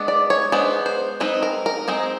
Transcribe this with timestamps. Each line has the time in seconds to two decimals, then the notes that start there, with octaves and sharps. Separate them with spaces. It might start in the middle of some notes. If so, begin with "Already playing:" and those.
Already playing: G#3 B3 D4
0.08 D5
0.30 C#5
0.52 G#3 B3 D4 C5
0.86 C5
1.20 G#3 C4 D#4 B4
1.42 A#4
1.66 A#4
1.88 G#3 C4 D#4 A#4